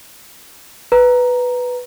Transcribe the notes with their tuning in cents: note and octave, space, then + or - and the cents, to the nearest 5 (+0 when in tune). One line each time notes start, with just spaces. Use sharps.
B4 +0 A#5 +0